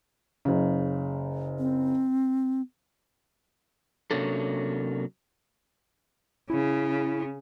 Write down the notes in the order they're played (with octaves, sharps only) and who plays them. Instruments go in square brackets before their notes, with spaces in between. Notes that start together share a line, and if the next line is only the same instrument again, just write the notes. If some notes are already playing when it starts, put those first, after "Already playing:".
[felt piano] F#1 C#3
[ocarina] C4
[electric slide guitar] C3 F#3 A#3 C#4 D4 A4
[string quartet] C#3 [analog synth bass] E4